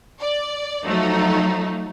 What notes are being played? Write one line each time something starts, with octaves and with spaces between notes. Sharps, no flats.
D5
F3 F#3 A3 D#4